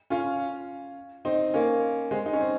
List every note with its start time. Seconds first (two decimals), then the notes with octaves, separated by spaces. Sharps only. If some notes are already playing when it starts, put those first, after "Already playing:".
0.10 C#4 F4
1.25 C4 D#4
1.54 A#3 C#4
2.11 G#3 C4
2.26 D#4
2.33 C#4
2.41 C4